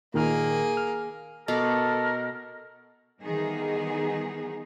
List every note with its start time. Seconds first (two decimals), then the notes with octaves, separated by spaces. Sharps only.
0.14 A#2 D#3 A#3 G#4 F6
0.77 F6
1.48 B2 A4 A#4 D#5 D6
3.22 D#3 E3 G3 B3 D#4 G#4